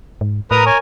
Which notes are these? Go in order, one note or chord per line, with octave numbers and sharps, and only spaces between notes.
G#2
A2 A#4 B4 A#5 D#6
A#4 C#5 G#5